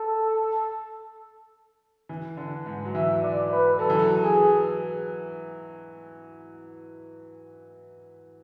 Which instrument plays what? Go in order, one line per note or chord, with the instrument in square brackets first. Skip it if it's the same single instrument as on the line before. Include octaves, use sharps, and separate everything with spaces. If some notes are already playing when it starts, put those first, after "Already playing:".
Already playing: [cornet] A4
[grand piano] E3
D3
G#2
F#3
[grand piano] E3 [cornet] E5
[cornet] D5
B4
[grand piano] F#3 [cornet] A4
[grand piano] E3
F#3
[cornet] G#4